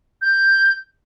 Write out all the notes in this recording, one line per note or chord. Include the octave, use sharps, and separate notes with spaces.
G6